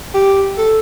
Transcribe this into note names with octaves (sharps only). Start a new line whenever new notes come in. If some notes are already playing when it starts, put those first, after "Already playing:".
G4
A4